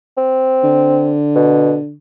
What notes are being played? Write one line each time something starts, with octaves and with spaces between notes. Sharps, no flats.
C4
D3
B2